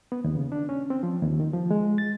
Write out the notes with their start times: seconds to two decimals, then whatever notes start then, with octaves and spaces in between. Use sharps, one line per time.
0.12 B3
0.24 D#2
0.37 C#3
0.52 D4
0.69 C#4
0.90 C4
1.03 F3
1.23 D#2
1.40 D#3
1.53 F3
1.71 G#3
1.98 A6